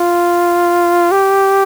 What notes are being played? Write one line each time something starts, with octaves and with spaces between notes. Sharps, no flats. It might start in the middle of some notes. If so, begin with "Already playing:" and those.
Already playing: F4
G4